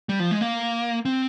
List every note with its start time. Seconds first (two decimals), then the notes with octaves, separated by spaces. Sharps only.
0.09 G3
0.20 F3
0.31 G#3
0.41 A#3
1.05 C4